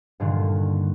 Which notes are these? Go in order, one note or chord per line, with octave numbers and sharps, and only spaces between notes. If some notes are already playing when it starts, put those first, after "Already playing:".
G2 A#2 D3 D#3